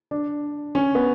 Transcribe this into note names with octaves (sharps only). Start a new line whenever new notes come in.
D4
C#4
B3